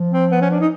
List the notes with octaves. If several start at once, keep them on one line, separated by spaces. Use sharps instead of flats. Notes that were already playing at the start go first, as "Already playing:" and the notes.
Already playing: F3
C4
B3
C#4
D4
D#4